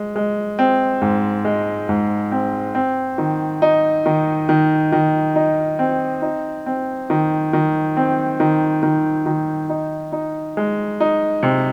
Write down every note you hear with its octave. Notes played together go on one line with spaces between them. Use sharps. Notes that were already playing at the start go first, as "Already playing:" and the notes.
Already playing: G#3
G#3
C4
G#2
G#3
G#2
C4
C4
D#3
D#4
D#3
D#3
D#3
D#4
C4
D#4
C4
D#3
D#3
C4
D#3
D#3
D#3
D#4
D#4
G#3
D#4
C3